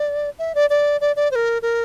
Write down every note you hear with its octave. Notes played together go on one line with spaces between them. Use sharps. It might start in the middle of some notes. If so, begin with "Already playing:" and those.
Already playing: D5
E5
D5
D5
D5
D5
C5
A#4
A#4